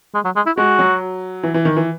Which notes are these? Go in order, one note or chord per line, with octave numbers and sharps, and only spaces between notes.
G#3
F#3
G#3
E4
G#3 F#4
F#3
E3
E3
D#3
E3